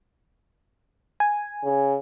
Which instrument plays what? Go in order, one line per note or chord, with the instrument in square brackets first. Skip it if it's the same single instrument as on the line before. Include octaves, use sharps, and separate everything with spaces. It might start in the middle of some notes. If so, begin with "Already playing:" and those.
[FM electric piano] G#5
[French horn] C#3